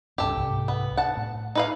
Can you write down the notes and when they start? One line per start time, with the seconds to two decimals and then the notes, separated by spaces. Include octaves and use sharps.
0.18 C#2 G2 C#4 G4 A4
0.36 C2 G#2
0.68 B3
0.97 F#5 A5
1.17 A2
1.55 D#4 B4 F5